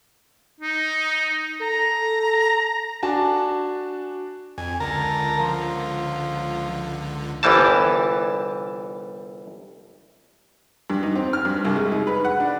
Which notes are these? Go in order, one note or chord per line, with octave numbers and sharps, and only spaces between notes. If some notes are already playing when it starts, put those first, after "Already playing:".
D#4
A4 A#5
D4 F#4 G#5 A5
F2 G#5
C#2 D3 A#4 A5 A#5
F3
G1 C2 E3 G3 A5
G2
D#4
C4
F6
G2
C2
G#3
D#4
B4
F#5
D4